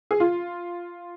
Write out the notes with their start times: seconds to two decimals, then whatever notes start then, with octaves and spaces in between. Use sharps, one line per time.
0.11 G#4
0.20 F4